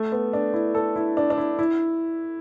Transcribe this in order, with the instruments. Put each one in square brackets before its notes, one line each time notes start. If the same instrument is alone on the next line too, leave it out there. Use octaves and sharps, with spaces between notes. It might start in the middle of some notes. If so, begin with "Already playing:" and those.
Already playing: [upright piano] A3
B3
D4
E4
A4
E4
D4
D4
E4
E4